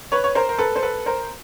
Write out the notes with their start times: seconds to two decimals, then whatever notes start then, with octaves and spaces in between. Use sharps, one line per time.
0.12 B4 C#5
0.24 C#5
0.35 A#4 C5
0.49 A#4
0.58 A4 B4
0.76 C5
0.83 A4 B4
1.06 A#4 C5